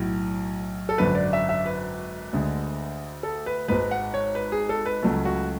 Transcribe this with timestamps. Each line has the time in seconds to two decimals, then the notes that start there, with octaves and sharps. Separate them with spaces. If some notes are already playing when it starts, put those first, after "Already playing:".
Already playing: B1 A2 F#3
0.89 A4
0.98 G#1 F#2 D3 B4
1.15 D5
1.33 E5
1.49 E5
1.66 B4
2.33 D2 D3 G#3
3.23 A4
3.46 B4
3.68 G#1 G#2 G#3 B4
3.91 F#5
4.14 C#5
4.35 B4
4.52 G#4
4.69 A4
4.86 B4
5.02 C#2 C#3 F#3 A3
5.25 F#4